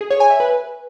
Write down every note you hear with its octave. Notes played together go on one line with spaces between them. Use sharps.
G#4
C#5
G#5
E5
B4